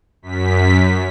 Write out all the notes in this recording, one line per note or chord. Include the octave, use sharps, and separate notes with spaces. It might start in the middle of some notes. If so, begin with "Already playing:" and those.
F#2 B6